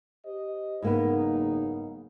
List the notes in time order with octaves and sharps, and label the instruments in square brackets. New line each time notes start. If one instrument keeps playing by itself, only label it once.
[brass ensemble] G4 C5 D#5
[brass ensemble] F#1 D#4 [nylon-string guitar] G#2 A#3 B3